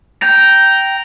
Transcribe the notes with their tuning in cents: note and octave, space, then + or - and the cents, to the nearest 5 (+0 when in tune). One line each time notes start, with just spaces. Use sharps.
G5 -10 A#5 +0